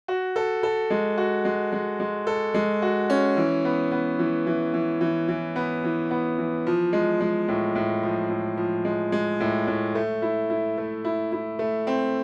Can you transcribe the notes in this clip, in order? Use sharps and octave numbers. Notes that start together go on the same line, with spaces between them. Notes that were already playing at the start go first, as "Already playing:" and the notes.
F#4
A4
A4
G#3
F#4
G#3
G#3
G#3
A4
G#3
F#4
C#4
E3
B3
B3
E3
E3
E3
E3
E3
B3
E3
B3
E3
F3
G#3
G#3
A2
A2
F3
A2
F3
G#3
G#3
A2
A2
A3
E4
E4
A3
E4
E4
A3
C4